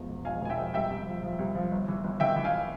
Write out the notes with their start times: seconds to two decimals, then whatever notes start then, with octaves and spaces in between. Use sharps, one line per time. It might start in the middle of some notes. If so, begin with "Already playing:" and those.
Already playing: E2 G#2 F3
0.09 E1
0.25 F3 F5 G#5
0.41 E1 G#5
0.50 E5 G5
0.58 F3
0.74 C2 E5 G5
0.90 C2
1.07 F3
1.23 F3
1.39 C2
1.55 F3
1.71 G1
1.88 E3
2.04 G1
2.20 E3 E5 G5
2.36 E3
2.44 F5 G#5